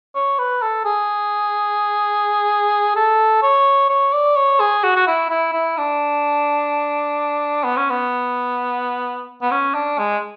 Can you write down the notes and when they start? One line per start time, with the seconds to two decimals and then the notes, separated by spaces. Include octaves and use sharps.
0.15 C#5
0.39 B4
0.62 A4
0.85 G#4
2.96 A4
3.43 C#5
3.89 C#5
4.13 D5
4.36 C#5
4.60 G#4
4.84 F#4
4.96 F#4
5.07 E4
5.30 E4
5.53 E4
5.77 D4
7.64 B3
7.77 C#4
7.90 B3
9.42 B3
9.51 C#4
9.74 D4
9.99 G#3